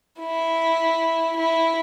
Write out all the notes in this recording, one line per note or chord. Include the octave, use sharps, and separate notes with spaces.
E4
E4